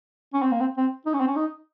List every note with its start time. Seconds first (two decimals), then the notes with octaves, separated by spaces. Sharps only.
0.33 C#4
0.42 C4
0.51 A#3
0.60 C4
0.77 C4
1.06 D#4
1.13 C#4
1.20 C4
1.27 C#4
1.36 D#4